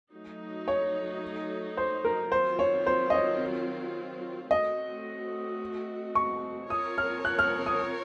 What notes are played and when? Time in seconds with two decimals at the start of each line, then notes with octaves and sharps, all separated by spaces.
0.13 F#3 A3 D#4
0.68 C#5
1.77 C5
2.05 A#4
2.32 D#3 F#3 C4 F4 C5
2.59 C#5
2.87 C5
3.10 D#5
3.14 C#5
4.51 A3 C4 F#4 D#5
6.15 C#6
6.70 C4 F4 A#4 C#5 D#6
6.98 F6
7.25 F#6
7.39 F6
7.66 D#6